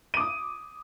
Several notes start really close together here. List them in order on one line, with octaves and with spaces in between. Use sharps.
D#7 D6 D#6